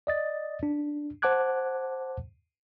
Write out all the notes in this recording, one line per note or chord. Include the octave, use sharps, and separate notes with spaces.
D5 D#5 A6
D4
C5 F#5 A5 D6 F#6 G#6